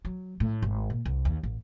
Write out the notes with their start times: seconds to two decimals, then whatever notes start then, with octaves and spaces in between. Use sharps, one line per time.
0.05 F#3
0.40 A2
0.62 G#1
0.90 A#2
1.05 C2
1.25 D#2
1.43 A1